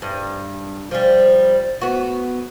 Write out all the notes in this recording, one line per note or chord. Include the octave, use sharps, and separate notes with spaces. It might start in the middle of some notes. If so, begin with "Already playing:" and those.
G2
F3 G3
B3 F#4